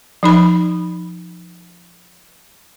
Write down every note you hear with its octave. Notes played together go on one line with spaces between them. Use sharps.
F3 D#4 B5